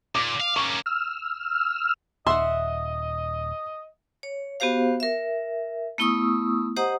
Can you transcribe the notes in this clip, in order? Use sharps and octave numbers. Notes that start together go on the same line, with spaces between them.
A#2 D6
F5
A#3 C#4 C#6
E6 F6
D#1 D#5 E5 F#5 C6 E6
C#5
B3 F#4 G4 C5 F5
A#4 E5
A3 B3 E4 C#6 D#6 E6
G4 C5 D#5 F#5 A#5 D#6